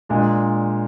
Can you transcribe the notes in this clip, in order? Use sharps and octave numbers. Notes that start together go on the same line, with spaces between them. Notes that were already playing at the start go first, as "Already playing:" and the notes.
A#2 G#3 D4